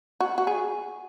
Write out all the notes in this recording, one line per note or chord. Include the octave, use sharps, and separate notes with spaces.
F#4
F#4
G#4